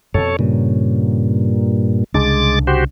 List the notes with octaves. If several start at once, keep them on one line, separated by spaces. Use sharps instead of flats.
F2 B2 A4 C#5
G2 A#2 C#3
C2 C#3 G#3 D4 D6 A6
F#4 G4 C5